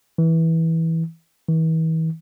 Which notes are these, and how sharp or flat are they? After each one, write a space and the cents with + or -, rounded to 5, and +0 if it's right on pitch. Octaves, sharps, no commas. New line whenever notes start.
E3 -15
E3 -40